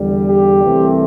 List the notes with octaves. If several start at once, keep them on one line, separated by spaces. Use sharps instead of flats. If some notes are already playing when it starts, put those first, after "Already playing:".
Already playing: E2 D3 G3
G4
C2 C3 E3 A3 C4